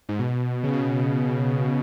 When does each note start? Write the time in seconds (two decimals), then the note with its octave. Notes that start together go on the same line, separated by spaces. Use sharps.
0.09 G#2
0.19 B2
0.64 C#3
0.73 B2